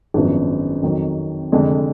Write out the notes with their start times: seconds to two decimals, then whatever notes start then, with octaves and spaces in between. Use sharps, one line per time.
0.14 G#1 F#2 F3 B3 D4
0.83 F2 D#3 F#3
1.52 F1 F2 D3 G#3